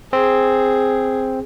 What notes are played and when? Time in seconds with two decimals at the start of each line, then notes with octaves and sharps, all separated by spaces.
0.13 C4 G#4